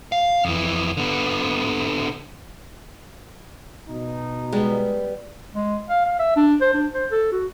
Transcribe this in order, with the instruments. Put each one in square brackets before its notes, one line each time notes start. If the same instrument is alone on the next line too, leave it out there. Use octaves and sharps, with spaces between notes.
[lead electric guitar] F5
F2 E3
D3 B3
[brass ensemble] B2 D#4
[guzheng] G3 B3 [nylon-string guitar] G#3
[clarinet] G#3
F5
F5
E5
D4
C5
D4
C5
A4
F#4